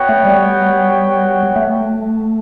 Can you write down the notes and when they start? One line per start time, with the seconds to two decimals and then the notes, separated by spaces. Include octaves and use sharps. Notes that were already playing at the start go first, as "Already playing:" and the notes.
Already playing: B3 F#4 C#5 G5
0.09 A3
0.25 G3
1.56 A3